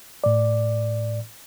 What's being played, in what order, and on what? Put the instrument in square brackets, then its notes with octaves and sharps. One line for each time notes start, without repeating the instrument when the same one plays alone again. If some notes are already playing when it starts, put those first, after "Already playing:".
[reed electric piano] A2 D5